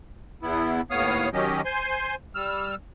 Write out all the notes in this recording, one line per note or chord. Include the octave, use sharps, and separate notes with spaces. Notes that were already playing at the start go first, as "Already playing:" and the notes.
E2 B3 E4
D#2 A2 B3 C#5 F5 D#6
D#3 F#3 C#4 G4 D#5
C5 G#5 C6
G3 E6 F6